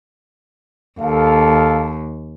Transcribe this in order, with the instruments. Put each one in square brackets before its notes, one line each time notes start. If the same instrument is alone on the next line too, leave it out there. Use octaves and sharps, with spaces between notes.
[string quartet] D#2 [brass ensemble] A4 F5